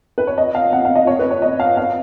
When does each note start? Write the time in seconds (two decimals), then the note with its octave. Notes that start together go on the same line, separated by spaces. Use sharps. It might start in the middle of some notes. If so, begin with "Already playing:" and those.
0.18 B4
0.27 C#5
0.38 D#5
0.55 F5
0.73 F#5
0.85 F5
0.95 D#5
1.07 C#5
1.19 B4
1.31 C#5
1.42 D#5
1.60 F5
1.77 F5